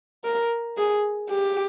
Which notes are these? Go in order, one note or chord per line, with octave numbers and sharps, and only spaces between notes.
A#4
G#4
G4